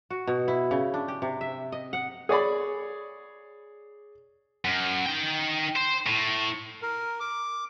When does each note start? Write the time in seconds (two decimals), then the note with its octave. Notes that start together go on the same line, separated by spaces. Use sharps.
0.10 F#4
0.27 B2
0.48 E4
0.71 C#3
0.94 D4
1.08 G4
1.22 C3
1.41 E5
1.72 D#5
1.93 F#5
2.29 G#4 C#5 D5 B5
4.64 F#2
5.06 D#4 G5
5.76 C5
6.07 A2
6.82 A#4
7.20 D6